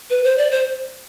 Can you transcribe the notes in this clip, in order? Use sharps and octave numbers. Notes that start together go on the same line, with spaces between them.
B4
C5
D5
C5